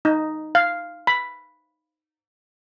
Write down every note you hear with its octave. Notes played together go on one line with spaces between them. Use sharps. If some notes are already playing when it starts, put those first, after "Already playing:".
D#4
F5
B5